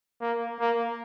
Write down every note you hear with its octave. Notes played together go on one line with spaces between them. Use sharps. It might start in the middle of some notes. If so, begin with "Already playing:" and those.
A#3
A#3